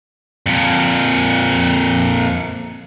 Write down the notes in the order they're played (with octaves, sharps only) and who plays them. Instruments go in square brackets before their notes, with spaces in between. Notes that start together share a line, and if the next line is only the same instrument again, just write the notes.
[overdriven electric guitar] F2 A#2